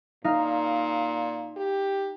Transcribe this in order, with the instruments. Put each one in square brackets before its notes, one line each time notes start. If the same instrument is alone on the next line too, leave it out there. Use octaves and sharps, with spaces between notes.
[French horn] A#2 [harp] D#4 F5
[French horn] G4